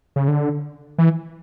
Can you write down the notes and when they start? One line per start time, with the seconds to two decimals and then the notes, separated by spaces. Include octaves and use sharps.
0.16 C#3
0.28 D3
0.98 E3